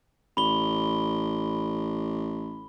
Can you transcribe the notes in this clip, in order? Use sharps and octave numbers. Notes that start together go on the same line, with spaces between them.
A1 B5 G7